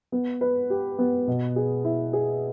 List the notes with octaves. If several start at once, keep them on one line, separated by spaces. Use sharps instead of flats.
B3
B4
G4
B3
B2
G#4
E4
G#4